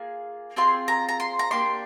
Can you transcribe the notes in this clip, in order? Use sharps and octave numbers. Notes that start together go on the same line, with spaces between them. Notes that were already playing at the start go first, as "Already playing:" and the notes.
Already playing: A#3 F4 G#4
C4 F4 G#4 C6
A#5
A#5
C6
A#5
A#3 D4 G4 C6